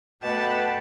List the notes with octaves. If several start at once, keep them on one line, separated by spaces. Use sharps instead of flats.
B2 A3 D4 G4 B4 F#5 A5